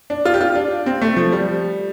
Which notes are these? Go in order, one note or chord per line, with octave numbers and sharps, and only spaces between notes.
D4
F4
G4
F4
D4
C4
A3
F3
G3